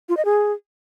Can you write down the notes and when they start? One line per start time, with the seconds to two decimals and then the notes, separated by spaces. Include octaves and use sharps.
0.09 F4
0.17 D#5
0.25 G#4